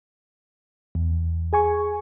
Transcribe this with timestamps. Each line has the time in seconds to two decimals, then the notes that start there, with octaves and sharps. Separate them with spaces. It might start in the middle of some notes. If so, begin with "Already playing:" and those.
0.95 E2
1.53 G#4 G#5 C#6